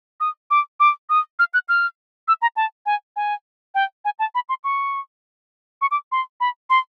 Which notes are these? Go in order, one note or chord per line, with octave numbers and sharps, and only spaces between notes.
D#6
D6
D6
D#6
F6
F#6
F6
E6
A#5
A5
G#5
G#5
G5
G#5
A5
B5
C6
C#6
C#6
D6
C6
B5
C6